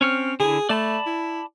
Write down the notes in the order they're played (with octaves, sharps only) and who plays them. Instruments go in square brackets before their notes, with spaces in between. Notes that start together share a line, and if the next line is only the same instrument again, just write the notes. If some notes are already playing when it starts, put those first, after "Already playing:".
[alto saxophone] C4 [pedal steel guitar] C#4 C#5 F6
[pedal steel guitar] D3 E4 [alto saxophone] G#4
[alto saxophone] A3 [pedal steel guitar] D5 A5 B5
[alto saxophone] E4